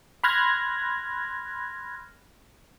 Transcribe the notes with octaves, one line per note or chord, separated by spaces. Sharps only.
B5 C6 F6 F#6 G#6 A#6